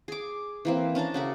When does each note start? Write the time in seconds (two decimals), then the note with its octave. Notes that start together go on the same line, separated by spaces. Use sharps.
0.08 G#4 D6
0.65 E3 A#3 C4
0.95 C#4 D4 A5 A#5
1.14 C#3 F#4 A#4